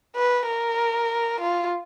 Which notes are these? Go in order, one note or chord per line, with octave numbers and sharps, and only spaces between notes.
B4
A#4
F4